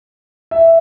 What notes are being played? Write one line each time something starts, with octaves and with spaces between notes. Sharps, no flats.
E5